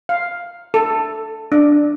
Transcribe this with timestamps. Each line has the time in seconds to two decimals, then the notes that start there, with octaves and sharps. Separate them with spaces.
0.09 F5
0.74 A4
1.52 D4